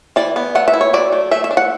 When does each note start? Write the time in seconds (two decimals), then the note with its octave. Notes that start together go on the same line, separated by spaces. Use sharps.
0.16 E3 D5
0.36 B3
0.55 A3 F#5
0.68 E5
0.74 E4
0.81 C#5
0.93 F#3 D5
1.12 A3
1.31 A3 E5
1.44 E5
1.51 D4
1.57 F#5